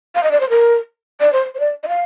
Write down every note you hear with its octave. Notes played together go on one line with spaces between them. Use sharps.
F5
D#5
D5
C5
A#4
D5
C5
C5
D5
D#5
F5